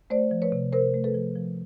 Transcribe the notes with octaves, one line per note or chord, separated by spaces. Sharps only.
A3 C5 D5
F3
B4 C#5
C3
C3 A#4 C5
A3
A4 B4
F3
F3